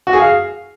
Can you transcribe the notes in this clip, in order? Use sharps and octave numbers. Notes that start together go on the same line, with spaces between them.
F#4
G#4
F5